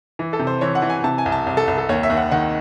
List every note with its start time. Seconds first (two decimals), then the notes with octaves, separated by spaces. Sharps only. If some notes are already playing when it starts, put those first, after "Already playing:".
0.19 E3
0.33 A4
0.39 C3
0.47 C5
0.61 E3 C#5
0.75 F#5
0.82 E3
0.90 G#5
1.04 C3 A5
1.18 G#5
1.26 C2
1.32 A5
1.47 C2
1.57 A4
1.68 C2
1.78 A4
1.89 D#2 C#5
2.03 E5
2.10 D#2
2.17 F#5
2.31 D#3 F#5